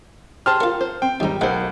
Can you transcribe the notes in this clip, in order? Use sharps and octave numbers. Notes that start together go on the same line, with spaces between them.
G4 G#4 C5 A5 C6 F6
F4 A#4 F#5
C5
C4 G5
D#2 G#2 G3 D#4
B1 G#3 A#4 C5 F#5